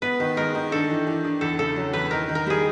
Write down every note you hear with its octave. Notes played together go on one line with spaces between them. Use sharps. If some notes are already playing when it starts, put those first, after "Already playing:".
B3 B4
D#3
G#3 A#4
D#3
D4 A4
E3
E3
D4
E2 A4
C#3 A4
F#3
E2 B4
D#3 A#4
D#3
A#4
G3 G#4